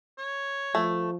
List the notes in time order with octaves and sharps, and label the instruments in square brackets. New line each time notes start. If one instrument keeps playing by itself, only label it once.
[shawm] C#5
[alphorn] F3 [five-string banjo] A3